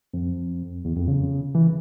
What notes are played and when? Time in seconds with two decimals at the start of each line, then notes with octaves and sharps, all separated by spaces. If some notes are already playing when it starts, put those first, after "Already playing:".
0.13 F2
0.85 E2
0.96 F2
1.08 C#3
1.55 E3